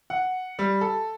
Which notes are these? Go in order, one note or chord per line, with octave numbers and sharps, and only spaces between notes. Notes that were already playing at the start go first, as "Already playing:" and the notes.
F#5
G3
A4